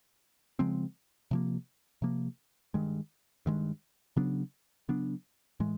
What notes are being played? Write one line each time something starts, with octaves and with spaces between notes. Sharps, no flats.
C#3 F3 G#3 C4
C3 F3 A#3
C3 F3 A#3
G2 D#3 G#3
G2 D#3 G#3
C#3 F#3 B3 D4
C#3 F#3 B3 D4
A2 E3 G#3